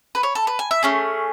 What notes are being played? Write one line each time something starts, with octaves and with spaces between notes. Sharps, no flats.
B4
C#5
A4
B4
G#5
E5
A3 C#4 G#4